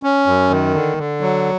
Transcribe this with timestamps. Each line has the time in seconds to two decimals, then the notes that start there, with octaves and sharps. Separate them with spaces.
0.03 C#4
0.26 F#2
0.50 D#3
0.74 D3
0.97 D3
1.21 F#3